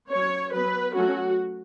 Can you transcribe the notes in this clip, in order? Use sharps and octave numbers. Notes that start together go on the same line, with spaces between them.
F#3 C#4 C#5
F#3 B3 B4
F#3 A3 C#4 F#4